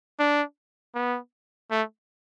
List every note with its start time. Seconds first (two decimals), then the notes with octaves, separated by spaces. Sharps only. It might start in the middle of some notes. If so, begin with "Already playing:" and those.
0.19 D4
0.95 B3
1.71 A3